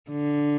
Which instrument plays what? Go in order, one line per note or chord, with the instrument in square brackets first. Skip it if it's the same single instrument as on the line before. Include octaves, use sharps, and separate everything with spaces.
[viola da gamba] D3